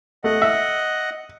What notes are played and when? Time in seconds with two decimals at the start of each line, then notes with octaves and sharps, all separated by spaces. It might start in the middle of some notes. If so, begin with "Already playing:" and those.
0.24 A3 D#5 F#5
0.42 E5